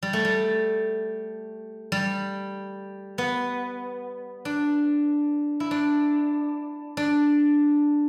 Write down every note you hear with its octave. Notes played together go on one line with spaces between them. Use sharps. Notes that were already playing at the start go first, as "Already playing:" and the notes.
G3
A3
G3
G3
B3
D4
E4
D4
D4